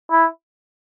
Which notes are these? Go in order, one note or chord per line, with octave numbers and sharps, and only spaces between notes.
E4